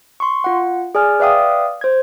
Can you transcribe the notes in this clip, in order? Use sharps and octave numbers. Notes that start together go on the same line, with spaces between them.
C6 C#6
F4 F#5
G#4 D5 G#5 F6
B4 D5 E5 F5 G5 D#6
C5 G#6